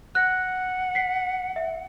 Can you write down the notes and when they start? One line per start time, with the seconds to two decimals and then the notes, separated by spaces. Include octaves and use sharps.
0.15 F#5 F#6 A#6
0.95 B6 C7
1.56 E5